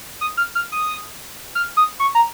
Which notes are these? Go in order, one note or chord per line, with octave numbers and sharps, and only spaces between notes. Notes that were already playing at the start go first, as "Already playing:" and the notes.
D#6
F6
F6
D#6
F6
D#6
C#6
A#5